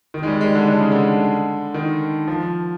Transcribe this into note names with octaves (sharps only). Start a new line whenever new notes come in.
D#3
G#3
G3
G#3
D3
D3
C#3
D3
D#3
F3